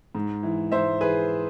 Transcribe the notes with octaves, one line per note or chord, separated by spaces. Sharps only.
G#2
E3
G#2 C5 E5
E3 G#4 B4